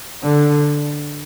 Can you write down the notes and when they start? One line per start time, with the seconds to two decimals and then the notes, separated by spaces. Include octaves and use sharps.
0.23 D3